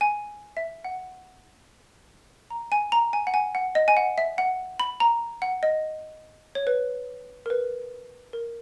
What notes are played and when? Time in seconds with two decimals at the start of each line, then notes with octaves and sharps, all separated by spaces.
0.01 G#5
0.57 E5
0.84 F#5
2.51 A#5
2.72 G#5
2.92 A#5
3.13 G#5
3.27 F#5
3.34 G#5
3.55 F#5
3.75 D#5
3.88 G#5
3.97 F#5
4.18 E5
4.38 F#5
4.80 B5
5.00 A#5
5.42 F#5
5.63 D#5
6.55 C#5
6.67 B4
7.46 A#4
7.50 B4
8.33 A#4